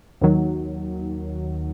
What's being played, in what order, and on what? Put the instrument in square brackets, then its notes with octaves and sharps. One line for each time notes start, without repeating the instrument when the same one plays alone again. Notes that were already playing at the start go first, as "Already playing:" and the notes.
[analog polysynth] D#2 D#3 F#3